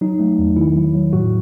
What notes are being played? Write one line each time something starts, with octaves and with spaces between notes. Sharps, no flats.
F#3 D#4
A3
E2
D#3 E4
F#3
F#3
A2 F#4